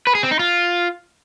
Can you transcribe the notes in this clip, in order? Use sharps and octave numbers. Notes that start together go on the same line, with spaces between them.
B4
G#4
C4
D#4
F4